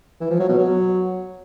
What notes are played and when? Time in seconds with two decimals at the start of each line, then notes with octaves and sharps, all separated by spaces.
0.21 E3
0.30 F3
0.40 F#3
0.49 B2
0.58 F#3